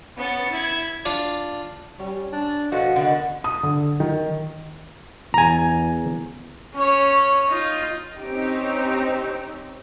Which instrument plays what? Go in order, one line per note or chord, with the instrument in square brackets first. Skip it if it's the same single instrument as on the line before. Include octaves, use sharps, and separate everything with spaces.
[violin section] B3 C#4 A6 C#7
E4 G#6
[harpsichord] D4 F4
[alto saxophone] G3 [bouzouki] C#4
[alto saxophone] D4
[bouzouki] B2 F3 A3 [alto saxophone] F#4
[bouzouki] D3 D#3 B3
[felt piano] D#6
D3
D#3
[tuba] E2 [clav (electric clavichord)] G#5 A#5
[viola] C#4 C#5
D#4 F4
[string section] C4 C#4 D#4 G4